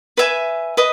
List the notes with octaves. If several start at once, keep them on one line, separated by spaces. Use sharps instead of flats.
B4 E5 G#5
B4 D#5